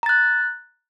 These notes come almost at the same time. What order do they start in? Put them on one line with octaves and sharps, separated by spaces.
A#5 A6 F#6